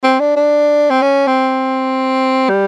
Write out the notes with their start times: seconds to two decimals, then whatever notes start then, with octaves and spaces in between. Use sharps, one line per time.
0.04 C4
0.20 D4
0.36 D4
0.90 C4
1.02 C#4
1.27 C4
2.49 G3